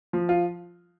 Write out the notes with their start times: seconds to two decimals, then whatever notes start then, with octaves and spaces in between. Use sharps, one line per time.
0.13 F3
0.29 F4